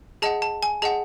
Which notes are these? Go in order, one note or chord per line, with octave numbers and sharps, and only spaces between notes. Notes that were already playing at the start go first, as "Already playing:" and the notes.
G#4 D#5 F#5 A5
A5
G#5
G#4 D#5 F#5 A5